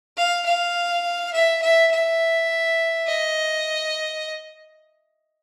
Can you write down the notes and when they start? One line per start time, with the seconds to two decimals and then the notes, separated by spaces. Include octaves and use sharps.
0.17 F5
0.46 F5
1.33 E5
1.62 E5
1.91 E5
3.08 D#5